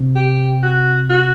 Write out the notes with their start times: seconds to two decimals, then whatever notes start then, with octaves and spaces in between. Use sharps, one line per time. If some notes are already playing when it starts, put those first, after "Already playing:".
Already playing: C3
0.15 G4
0.63 F#4
1.10 F#4